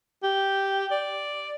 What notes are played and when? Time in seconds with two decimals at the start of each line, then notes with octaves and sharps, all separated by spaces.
0.23 G4
0.91 D5